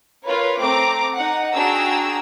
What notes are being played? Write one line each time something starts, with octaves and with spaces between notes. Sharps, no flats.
F4 A#4 B4 C#5
A3 C4 A#5 D6 D7
D#4 F#5
D4 F#4 G#4 G5 A#5 E6